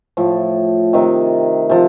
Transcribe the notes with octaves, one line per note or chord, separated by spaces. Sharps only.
A2 F3
C3 D#3
C3 F3